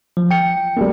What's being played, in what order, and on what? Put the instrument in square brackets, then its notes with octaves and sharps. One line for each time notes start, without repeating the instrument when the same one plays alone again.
[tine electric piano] F3
G5 C#7
[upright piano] G3 A3 A#3